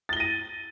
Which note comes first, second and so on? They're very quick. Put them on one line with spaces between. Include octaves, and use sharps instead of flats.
A6 G7 A#6 D#7